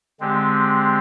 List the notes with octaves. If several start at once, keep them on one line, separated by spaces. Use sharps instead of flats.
D3 G#3 C4 G4